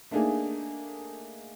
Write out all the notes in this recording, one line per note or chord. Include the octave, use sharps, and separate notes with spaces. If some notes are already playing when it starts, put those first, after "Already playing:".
A3 A#3 D4 D#4 G#4